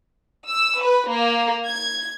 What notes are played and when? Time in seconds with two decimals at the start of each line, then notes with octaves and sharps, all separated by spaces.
0.47 E6
0.80 B4
1.09 A#3
1.65 G#6